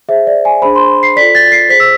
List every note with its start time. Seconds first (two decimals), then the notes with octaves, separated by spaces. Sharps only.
0.09 G#4 C5 E5
0.27 D5
0.45 G#5
0.62 D4 G#4 C5 B5
0.75 C6
1.03 C7
1.16 F4 A4 D5 B6
1.35 A6
1.52 C7
1.69 G#4 C5 B6
1.80 E6